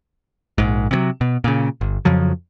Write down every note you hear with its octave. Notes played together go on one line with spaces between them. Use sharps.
A#1 G#2
C3 D#3 F#3
B2
A#2 C#3
G1
F2 C#3 F3 F#3